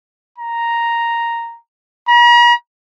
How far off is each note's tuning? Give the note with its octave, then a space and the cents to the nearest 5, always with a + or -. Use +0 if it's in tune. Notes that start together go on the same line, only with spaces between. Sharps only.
A#5 +0
A#5 +45